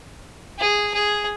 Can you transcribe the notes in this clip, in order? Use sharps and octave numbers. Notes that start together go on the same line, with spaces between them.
G#4
G#4